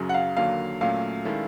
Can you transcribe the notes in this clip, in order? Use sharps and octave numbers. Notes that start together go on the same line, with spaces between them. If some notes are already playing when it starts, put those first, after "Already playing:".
Already playing: F#2 C#3 F#3
F#5
F5
D#2 D3 F#3 A#3 F5
A#2 F#3 A3 C#4 F5
D#3 G#3 C#4 E4 A4